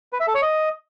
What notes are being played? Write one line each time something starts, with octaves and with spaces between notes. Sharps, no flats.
B4
E5
A4
C#5
D#5